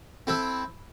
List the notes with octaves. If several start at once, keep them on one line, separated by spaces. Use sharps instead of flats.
C4 E4 A4